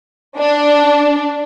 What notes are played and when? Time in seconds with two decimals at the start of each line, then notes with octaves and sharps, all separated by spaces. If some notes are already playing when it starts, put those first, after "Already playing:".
0.37 D4